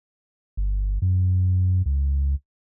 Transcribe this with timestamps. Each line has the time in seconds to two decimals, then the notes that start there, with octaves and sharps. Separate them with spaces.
0.57 G1
1.02 F#2
1.86 C#2